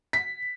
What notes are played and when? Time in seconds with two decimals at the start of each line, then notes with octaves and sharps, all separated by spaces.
0.13 B6